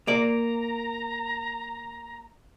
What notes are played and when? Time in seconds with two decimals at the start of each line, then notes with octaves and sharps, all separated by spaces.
0.07 A#3 D5 A#5